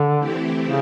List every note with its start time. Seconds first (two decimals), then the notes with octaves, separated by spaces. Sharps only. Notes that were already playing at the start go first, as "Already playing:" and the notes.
Already playing: D3
0.19 E3 A3 C4 E4 G4
0.65 C#3